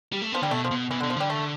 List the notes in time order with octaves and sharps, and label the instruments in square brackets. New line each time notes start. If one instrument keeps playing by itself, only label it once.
[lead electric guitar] G3
A3
[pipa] F3 [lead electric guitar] B3
[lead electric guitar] D3 [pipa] G3
[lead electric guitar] B2 [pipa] A3
[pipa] F3
[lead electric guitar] B2
[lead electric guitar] B2 [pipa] E3
[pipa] D3
[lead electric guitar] B2
[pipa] F3
[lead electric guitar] D3 [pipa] G3
[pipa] A3